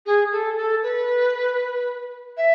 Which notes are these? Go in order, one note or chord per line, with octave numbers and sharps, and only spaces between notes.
G#4
A4
A4
B4
E5